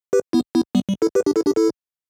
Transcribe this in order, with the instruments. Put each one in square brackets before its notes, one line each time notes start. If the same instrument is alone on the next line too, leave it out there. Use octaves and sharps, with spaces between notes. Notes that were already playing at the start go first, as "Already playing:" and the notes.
[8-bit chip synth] G4 B4
B3 E4
B3 E4
G3 B3
G3
E4 A4
G4 B4
D4 G4
E4 A4
D4 G4
E4 A4